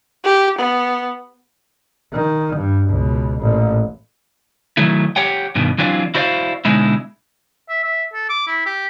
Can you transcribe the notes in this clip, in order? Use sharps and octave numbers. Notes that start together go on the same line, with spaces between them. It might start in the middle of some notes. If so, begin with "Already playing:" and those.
G4
B3
D#3
G2
C#2 B2
A1 A#2
D#3 F#3 A3 E4
G4 C#5 F#5 G5
G2 B2 D#3
E3 F#3 C4 D4 F4
E4 F#4 C5 D5 D#5 F5
B2 D3 G#3 D#4 E4
E5
E5
A4
D6
E4
G4